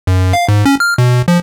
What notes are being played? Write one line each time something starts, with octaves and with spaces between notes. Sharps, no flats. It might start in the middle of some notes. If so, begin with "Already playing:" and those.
F#2
F5
G#2
C#4
F6
B2
F3